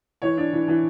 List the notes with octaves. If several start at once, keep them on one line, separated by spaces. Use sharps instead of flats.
E3 C#5
D4
E3
E3